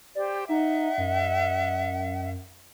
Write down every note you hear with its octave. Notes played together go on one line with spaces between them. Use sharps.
G4 C5 D5
D#4 D#5 E5 F#5
F#2